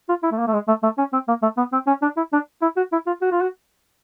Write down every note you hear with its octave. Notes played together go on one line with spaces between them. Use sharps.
F4
E4
A3
A#3
A3
G#3
A3
A3
C#4
C4
A#3
A3
B3
C4
C#4
D4
E4
D4
E4
F#4
E4
F4
F#4
F4
F#4